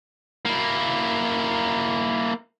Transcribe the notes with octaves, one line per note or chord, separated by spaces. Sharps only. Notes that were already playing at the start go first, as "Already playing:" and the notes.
A#3 E4